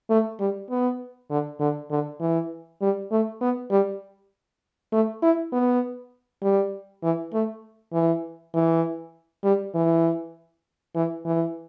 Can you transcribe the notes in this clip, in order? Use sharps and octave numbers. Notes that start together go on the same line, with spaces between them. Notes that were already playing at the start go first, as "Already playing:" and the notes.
A3
G3
B3
D3
D3
D3
E3
G3
A3
B3
G3
A3
E4
B3
G3
E3
A3
E3
E3
G3
E3
E3
E3